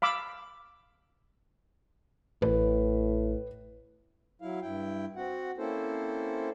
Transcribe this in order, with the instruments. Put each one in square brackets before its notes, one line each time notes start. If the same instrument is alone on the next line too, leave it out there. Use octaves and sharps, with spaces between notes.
[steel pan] F5 B5 D6 E6
[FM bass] A1 [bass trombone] A2 [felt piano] B4
[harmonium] F#3 E4 F5
G2 E4 G5
C4 F#4 F#5
A#3 C4 C#4 E4 A4 C5